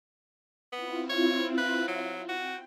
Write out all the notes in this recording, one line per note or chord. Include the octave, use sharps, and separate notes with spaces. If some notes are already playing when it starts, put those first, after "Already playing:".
B3 C4 E4 F4
C#5
B4
F#3
F#4 G5